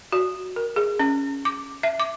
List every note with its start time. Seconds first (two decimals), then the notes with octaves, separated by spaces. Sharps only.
0.12 F#4
0.56 A#4
0.76 G#4
0.99 C#4
1.45 D6
1.83 E5
2.00 D6